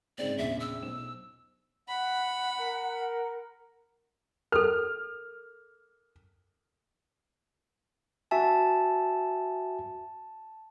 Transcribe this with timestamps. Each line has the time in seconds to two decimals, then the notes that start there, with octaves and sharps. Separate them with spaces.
0.18 G#2 C#3 C4 D5
0.38 A#1 E2 C#3 E5
0.60 E6
0.82 B1 C5 E7
1.88 F#5 B5
2.60 A#4
4.52 A4 A#4 F6
8.31 F#4 E5 G#5 A5